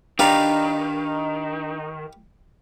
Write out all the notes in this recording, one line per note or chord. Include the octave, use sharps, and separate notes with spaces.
D#3 D4 G4 B4 D5 F5 A#5